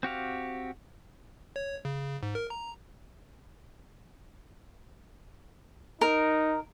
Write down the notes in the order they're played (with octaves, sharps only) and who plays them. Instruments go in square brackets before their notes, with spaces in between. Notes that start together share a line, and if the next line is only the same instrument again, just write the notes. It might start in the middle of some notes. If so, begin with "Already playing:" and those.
[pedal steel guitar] C4 F#4 G4 F5
[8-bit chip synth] C#5
C#3
G#2
A#4
A#5
[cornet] D#4 [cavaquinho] A#4